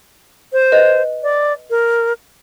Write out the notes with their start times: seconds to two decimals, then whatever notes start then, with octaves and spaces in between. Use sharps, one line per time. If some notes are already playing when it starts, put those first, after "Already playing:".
0.53 C5
0.72 B4 D#5
1.23 D5
1.70 A#4